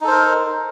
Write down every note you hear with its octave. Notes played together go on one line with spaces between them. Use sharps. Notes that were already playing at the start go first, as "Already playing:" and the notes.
D#4 A4 A#4 C5